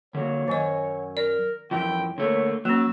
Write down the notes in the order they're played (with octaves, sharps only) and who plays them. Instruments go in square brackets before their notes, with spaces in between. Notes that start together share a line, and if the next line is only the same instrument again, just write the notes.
[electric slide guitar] D3 F#3 A#3 [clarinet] C#5
[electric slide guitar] F#2 G#5 [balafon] D#3 D#5
[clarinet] A#4 [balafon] D5
[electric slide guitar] F#2 E3 F3 [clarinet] G5
[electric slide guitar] D3 A3 A#3 [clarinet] C#5
[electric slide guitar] F#3 [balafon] A#3 C#4 [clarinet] E6